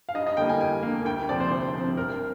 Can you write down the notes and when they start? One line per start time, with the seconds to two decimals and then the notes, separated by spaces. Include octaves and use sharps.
0.09 F5
0.14 G2 D#5
0.26 D#5
0.37 D3 G3 A#3 G5
0.49 G#5
0.60 G2 G#5
0.83 D3 G3 A#3
1.05 D2 G5
1.29 C3 F3 C4 D5
1.40 C5
1.51 D2 C5
1.74 C3 F3 C4
1.97 G1 A#4